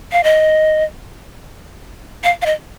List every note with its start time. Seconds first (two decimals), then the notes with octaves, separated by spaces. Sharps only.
0.12 F5
0.24 D#5
2.24 F5
2.42 F5
2.46 D#5